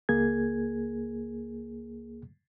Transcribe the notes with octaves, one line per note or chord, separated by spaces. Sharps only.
C#2 A#3 G#4 G#6